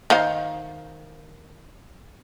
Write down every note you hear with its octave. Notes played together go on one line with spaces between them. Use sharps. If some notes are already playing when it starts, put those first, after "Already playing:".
D#3 C5 F5